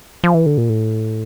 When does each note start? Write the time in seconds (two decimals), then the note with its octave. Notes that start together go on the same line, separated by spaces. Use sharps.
0.24 F3
0.34 E3
0.46 D3
0.58 A#2
0.69 A2